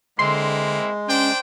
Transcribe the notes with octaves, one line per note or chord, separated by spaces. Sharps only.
D3 G#3 A#3 C4 E4 C6
C#4 D4 C5 G5